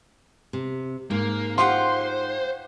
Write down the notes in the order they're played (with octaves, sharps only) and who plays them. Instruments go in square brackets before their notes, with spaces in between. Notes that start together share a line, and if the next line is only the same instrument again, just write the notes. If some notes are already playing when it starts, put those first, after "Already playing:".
[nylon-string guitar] C3
[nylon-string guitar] G#2 [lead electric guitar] A#3
[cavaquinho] F4 G4 F#5 [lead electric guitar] C5 [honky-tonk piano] C6